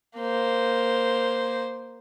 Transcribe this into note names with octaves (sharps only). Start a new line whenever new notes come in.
A#3 C5